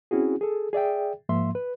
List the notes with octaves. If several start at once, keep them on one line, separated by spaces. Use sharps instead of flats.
C4 C#4 E4 F#4 G#4
G#4 A4
G#4 D5 E5 G5
G#2 F3 A#3 E5 C6
B4